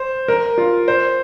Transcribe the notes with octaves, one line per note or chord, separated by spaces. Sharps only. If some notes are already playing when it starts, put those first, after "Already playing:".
Already playing: C5
A#4
F4
C5